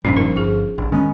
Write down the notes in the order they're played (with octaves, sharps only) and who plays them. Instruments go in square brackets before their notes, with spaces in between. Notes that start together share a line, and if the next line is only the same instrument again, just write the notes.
[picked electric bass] F1 G2 A#2 [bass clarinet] F3 [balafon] C#4 D4
[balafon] D#4 A#4
[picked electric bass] G1 [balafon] F4 G#4
[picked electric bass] A1 [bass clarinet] D4
[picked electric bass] D#3 G#3 B3 [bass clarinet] C#4